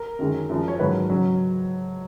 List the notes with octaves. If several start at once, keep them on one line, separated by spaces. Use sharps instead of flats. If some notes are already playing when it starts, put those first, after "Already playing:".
Already playing: A#4
F#2 D#3 G#3
F#2 F3 G#3
C#5
G#2 D#3 F#3 B4
C#3 F#3